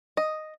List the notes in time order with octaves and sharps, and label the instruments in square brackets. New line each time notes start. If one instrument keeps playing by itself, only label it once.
[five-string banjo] D#5